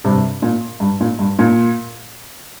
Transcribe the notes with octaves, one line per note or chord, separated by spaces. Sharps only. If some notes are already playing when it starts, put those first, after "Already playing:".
G2 C3
A#2
G2
A#2
G2
A#2